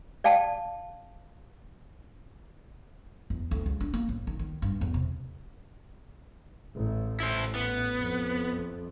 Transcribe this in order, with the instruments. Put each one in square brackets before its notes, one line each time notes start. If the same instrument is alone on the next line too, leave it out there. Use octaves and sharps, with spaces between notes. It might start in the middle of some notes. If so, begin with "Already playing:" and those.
[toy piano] D5 F5 G5 A5
[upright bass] E2
D2
C#2
D4
A#3
A1
D#3
D#3
G2
E2
C3
[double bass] A1
[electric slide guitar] E4 C5
B3
[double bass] F2